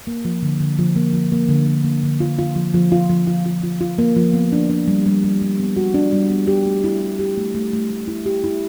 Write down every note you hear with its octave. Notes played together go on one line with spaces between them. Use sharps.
A#3
F3
D3
D3
F3
A#3
F3
A#3
D3
A#3
A#3
D3
F4
F4
F3
F3
F4
F3
F4
F4
F4
F4
A#3
F3
B3
D4
D4
G3
G3
G3
G3
B3
F#4
D4
G3
B3
G4
A3
E4
E4
G4
A3
A3
A3
A3
E4
G4
E4